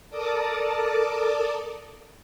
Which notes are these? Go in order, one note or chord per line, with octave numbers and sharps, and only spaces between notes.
A4 A#4 D5 A5 D6 D#6